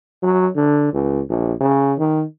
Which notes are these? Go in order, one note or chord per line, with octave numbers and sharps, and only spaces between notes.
F#3
D3
C#2
A#1
C#3
D#3